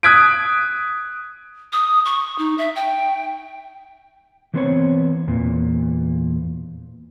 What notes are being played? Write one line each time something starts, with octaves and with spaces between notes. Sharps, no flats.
D#6 F#6 G#6 B6 D7
D#6
C#6
D#4
E5
G5
E3 F#3 B3 C4 C5 C#5
E2 A#2